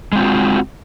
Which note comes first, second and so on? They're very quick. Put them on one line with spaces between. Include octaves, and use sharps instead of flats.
G#3 C4 F4 F#4